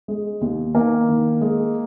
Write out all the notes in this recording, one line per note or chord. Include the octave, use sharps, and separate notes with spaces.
G#3
D#2
D#3 A#3
D#3
G#3